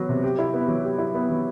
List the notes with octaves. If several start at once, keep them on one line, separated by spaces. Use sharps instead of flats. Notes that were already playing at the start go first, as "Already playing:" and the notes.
Already playing: F#3 B3
C3
G4
E4
B3
F#3
G4
E4
B3
F#3